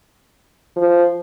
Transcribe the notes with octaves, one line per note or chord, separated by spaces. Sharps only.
F3